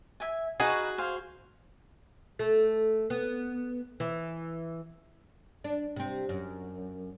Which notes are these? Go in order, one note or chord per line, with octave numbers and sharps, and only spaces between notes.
E5 G#5
D#4 F#4 G#4 B4 F5
C5 F5 G#5
A3
B3
E3
D4
C3 C4
F#2